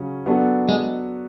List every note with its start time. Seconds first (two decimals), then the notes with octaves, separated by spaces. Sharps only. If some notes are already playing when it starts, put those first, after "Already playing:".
Already playing: C#3 F#3 C#4
0.26 F#3 B3 D4 F#4 A4
0.69 G#3